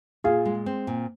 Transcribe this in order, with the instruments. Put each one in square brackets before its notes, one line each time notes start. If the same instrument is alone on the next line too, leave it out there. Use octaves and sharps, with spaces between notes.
[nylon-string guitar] A#2 [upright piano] F4 G#4
[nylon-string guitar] G#3
C4
A#2